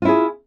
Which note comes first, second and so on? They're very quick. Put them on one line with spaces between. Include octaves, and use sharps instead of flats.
F4 E4 G#4